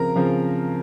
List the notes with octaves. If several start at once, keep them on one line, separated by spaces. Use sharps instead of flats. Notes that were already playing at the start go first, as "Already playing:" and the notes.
Already playing: C#3 F3 C4 A#4 A#5
C#3 F3 C4